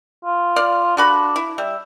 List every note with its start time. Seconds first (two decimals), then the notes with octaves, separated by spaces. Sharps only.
0.25 F4
0.56 D5 F5
0.97 D3 D4 F#4 B5
1.36 E4
1.58 G3 E5